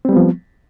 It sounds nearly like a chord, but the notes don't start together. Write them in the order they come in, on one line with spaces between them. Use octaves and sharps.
C4 G3 B3 F3